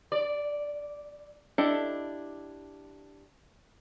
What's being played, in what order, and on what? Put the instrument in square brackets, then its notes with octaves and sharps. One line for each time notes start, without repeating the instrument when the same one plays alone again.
[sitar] D5
[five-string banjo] D4 E4 G4 A4 D#5